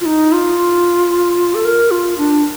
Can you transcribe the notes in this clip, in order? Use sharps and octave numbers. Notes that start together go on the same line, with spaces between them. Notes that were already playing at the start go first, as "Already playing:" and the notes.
F4
D#4
F4
A4
A#4
F4
D4